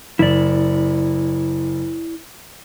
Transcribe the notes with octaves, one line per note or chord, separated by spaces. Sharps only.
F#1 E4 D5